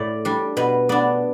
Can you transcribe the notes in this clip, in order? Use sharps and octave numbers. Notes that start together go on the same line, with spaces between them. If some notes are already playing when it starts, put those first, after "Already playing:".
Already playing: A2 D5
G3 D4
B2 B4
B3 D4 D5